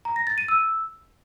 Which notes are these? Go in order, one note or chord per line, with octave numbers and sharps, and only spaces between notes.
A#5
A#6
A6
D#7
E6